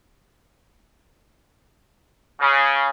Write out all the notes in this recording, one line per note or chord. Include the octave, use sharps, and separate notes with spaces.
C#3